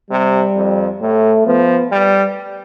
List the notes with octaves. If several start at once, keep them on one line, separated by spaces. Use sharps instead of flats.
C3 G3
F2
A2 A3
F3 B3
G3